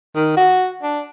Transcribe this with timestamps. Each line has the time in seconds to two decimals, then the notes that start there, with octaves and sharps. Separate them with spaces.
0.16 D#3
0.37 F#4
0.83 D4